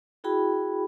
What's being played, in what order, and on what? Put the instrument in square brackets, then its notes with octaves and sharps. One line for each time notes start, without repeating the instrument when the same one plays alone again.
[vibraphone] E4 F#4 G#4 G5 B5